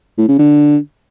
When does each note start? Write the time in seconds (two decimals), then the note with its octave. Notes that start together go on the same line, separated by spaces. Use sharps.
0.18 A2
0.28 C#3
0.39 D3